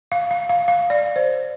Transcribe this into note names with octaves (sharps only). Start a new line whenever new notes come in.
F5
F5
F5
F5
D5
C5